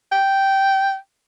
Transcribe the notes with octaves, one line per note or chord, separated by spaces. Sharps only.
G5